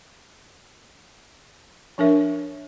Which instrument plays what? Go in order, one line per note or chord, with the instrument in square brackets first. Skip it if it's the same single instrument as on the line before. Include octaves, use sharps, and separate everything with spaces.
[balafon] F3 D4 A#4 E5